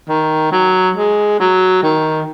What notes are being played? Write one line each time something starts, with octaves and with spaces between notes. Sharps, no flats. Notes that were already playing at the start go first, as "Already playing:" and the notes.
D#3
F#3
G#3
F#3
D#3